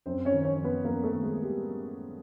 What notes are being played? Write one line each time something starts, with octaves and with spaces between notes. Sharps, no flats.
F#2 C4 C5
C#4 C#5
D#3
C#4 C#5
F#2
B3 B4
F#2 A#3 A#4
A3 A4
D#3
G#3 G#4
G3 G4